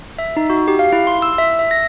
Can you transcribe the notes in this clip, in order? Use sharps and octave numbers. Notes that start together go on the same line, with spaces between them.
E5
D#4
F#4
G4
F5
E4
C6
E6
E5
E5
A#6